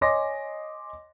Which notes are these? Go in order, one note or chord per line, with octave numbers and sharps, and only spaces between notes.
C#5 D#5 G#5 C6 D6 A#6